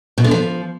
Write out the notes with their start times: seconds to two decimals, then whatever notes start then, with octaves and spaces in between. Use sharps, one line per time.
0.18 B2
0.24 D3
0.31 F3